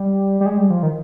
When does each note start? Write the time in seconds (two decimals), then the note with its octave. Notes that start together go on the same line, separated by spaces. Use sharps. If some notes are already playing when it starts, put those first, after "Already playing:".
Already playing: G3
0.41 G3
0.46 G#3
0.58 G3
0.70 F3
0.83 D#3